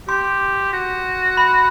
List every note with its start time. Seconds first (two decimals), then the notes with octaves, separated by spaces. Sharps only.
0.08 G4 C6
0.73 F#4
1.37 B5